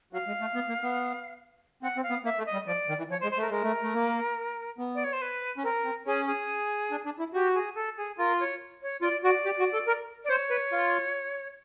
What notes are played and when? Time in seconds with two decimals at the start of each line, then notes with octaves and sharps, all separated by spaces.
0.13 F#3 F5
0.27 G#3
0.41 A3
0.55 B3
0.69 A#3
0.83 B3
1.83 C4 F#5
1.97 C4
2.03 F5
2.10 B3
2.24 A#3 E5
2.38 A3
2.46 D#5
2.53 G3
2.66 F3 D5
2.89 D#3
2.98 E3
3.10 F3 C#5
3.20 C5
3.23 G#3
3.31 C5
3.38 A3 A#4
3.50 G#3 A#4
3.63 A3
3.83 A3
3.94 A#3
4.78 B3
4.95 D5
5.04 C#5
5.13 C5
5.22 B4
5.58 C#4
5.63 C4 A#4
5.84 C4
6.06 C#4 G#4
6.27 G#4
6.91 D4
7.05 D4
7.19 E4
7.33 F#4 G4
7.54 G#4
7.75 A4
7.97 G#4
8.18 F4 A#4
8.40 C#5
8.82 C#5
9.02 F4 D5
9.23 F#4 D5
9.45 G4
9.59 F#4
9.73 A4
9.87 A#4
10.24 D5
10.29 C5 C#5
10.50 B4
10.72 F4